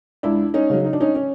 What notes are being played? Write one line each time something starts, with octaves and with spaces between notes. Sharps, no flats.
C#2 D4 E4
C#4 D#4
C#3 F#3
D#4
D4
C#4 D#4
C#4